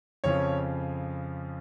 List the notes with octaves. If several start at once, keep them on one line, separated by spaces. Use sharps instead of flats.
F2 C#3 F3 C#5